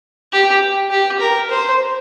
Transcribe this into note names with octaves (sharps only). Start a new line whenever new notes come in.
G4
G4
A#4
C5